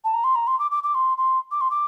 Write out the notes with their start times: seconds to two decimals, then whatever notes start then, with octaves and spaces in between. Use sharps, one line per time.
0.04 A5
0.14 A#5
0.24 C6
0.35 A#5
0.47 C6
0.59 D6
0.71 D6
0.83 D6
0.94 C6
1.17 C6
1.51 D6
1.61 C6
1.71 D6